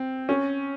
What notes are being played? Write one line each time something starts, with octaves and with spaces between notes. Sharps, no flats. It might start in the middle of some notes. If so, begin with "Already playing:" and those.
Already playing: C4
C#4